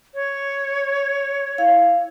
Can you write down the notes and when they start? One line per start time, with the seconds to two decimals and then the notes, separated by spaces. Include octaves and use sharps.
0.14 C#5
1.58 E4 F5